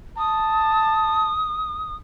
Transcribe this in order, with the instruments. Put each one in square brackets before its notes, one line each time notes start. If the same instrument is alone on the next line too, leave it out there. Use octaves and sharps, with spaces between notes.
[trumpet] A5 [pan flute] D#6